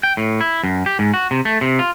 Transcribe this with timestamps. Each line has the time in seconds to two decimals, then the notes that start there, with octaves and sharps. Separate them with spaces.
0.03 G5
0.17 A2
0.41 E4
0.63 F#2
0.86 G4
0.99 G#2
1.14 F#4
1.31 C3
1.45 A3
1.61 C3
1.79 F4